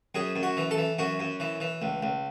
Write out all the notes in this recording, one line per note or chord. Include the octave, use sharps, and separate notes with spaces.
F#2 G#4
F#2
F#4
E3
A4
E3
F#2 F#4
F#2
E3
E3
C#2
C#2